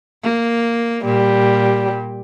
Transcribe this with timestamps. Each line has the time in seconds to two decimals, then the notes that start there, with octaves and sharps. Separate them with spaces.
0.23 A#3
1.05 A#2 G3